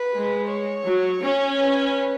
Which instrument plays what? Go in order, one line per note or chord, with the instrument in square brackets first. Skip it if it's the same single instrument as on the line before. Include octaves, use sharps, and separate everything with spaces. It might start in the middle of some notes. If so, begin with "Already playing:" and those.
Already playing: [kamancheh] B4
[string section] G#3
[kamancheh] C#5
[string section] F#3
C#4
[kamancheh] B4